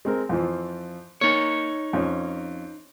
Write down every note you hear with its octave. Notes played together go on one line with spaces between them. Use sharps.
G#3 C4 A#4
F2 E3 F3
A#3 D#4 C#5
F2 C#4